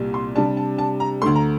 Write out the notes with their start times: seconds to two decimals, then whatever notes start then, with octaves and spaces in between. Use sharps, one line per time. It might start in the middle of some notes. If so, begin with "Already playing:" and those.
Already playing: C2 A#2 G3
0.14 C6
0.35 C3 G3 D4 A5
0.57 A5
0.78 A5
1.00 A#5
1.21 D2 D3 A3 C6
1.36 A#5